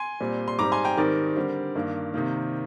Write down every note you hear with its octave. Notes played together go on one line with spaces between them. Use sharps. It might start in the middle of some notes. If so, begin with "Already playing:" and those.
Already playing: G#5 C6
A#2 G3 C4
C6
G#2 G3 C4 A#5 D6
G#5 C6
G5 A#5
G#2 D#3 G3 C4 A#4 D5
D3 G3 C4
G2 D#3 A#3
C3 D#3 A#3